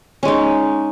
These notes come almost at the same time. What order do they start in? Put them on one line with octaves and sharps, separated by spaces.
C#4 G#3 D#4